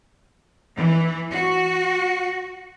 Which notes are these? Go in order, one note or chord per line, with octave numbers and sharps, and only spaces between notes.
E3
F#4